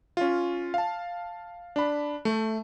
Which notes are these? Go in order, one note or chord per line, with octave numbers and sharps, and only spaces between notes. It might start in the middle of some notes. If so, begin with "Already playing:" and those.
C#4 F4
F5 A5
D4 B5
A3